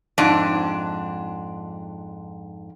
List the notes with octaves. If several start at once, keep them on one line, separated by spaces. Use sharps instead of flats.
F2 G#2 D4